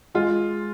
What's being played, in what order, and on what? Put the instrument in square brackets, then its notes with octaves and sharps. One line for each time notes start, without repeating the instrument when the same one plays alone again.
[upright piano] G#3 F4